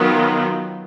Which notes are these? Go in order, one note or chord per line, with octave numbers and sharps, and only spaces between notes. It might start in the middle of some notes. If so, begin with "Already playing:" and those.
Already playing: D#3 F#3 B3 F4